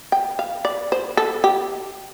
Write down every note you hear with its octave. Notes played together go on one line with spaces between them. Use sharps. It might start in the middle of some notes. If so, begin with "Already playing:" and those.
G5
F5
D5
C5
A4
G4